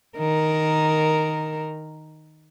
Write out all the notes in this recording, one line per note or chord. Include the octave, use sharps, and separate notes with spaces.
D#3 A#4